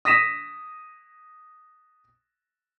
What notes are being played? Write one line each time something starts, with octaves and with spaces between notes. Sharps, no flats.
D#6 A#6 B6 D#7 E7